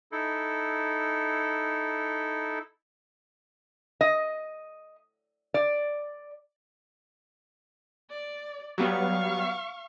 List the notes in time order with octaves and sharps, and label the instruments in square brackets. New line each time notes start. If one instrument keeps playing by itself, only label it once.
[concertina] D#4 E4 A4
[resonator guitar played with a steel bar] D#5
D5
[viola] D5
[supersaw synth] F#3 G3 B3 [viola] F5 C#6